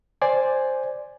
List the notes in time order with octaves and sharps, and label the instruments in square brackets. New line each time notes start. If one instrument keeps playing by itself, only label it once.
[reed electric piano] C5 D5 G#5